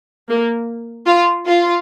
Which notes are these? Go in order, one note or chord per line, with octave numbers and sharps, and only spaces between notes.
A#3
F4
F4